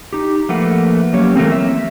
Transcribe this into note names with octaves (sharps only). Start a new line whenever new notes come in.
D#4 G4
F3 A3 A#3 B4 F#5
F#3 A#3 C#4 G4 C#5
E3 A3 A#3 C4
E5